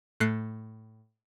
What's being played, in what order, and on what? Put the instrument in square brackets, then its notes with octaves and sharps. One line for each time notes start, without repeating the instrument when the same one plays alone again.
[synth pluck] A2 A3 F#6 C7